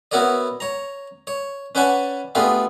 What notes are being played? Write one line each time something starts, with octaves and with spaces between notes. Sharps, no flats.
B3 E4 F#4 A#4 C#5 D5
C#5 A#5
C#5
C#4 B4 D5 F#5 G#5 A5
A3 B3 D4 F4 G4 G#4